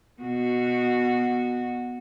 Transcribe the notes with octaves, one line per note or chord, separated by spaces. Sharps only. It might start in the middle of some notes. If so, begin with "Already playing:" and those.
B2 F#4